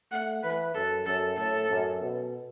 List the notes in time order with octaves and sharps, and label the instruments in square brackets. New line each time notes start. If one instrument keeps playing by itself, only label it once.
[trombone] A3 [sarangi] F#5
[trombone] E3 [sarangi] B4
[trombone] F#2 [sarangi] A4
[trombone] F#2 [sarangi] A4
[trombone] A2 [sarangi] A4
[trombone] F#2
B2